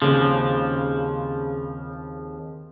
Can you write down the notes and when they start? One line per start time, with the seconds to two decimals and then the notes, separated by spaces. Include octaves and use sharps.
0.02 D#2 C#3 F3 C4 G#4